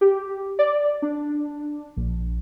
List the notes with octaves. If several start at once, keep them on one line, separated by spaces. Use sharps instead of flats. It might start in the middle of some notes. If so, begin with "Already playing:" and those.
G4
D5
D4
A#1